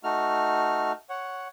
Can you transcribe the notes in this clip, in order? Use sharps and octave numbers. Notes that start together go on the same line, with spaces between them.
A3 D#4 F#4 F6
C#5 F#5